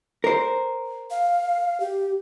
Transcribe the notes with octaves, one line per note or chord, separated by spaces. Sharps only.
A#4 C5
F5
G4